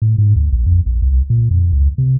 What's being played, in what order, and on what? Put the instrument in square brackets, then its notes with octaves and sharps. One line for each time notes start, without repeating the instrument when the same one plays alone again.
[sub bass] A2
G#2
D2
A#1
F2
A#1
C2
A#2
F2
C#2
C3